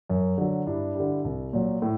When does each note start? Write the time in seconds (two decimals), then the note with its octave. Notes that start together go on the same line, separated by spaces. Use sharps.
0.09 F#2
0.38 D3 F#3
0.67 G2 D4 E4
0.95 D3 G3
1.25 C2
1.53 A#2 F#3
1.82 A2